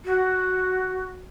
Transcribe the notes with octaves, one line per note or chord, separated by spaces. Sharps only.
F#4